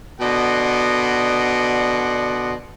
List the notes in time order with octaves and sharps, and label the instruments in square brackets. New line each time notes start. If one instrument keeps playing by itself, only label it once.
[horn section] B2 D3 D5 D#5 F#5 C6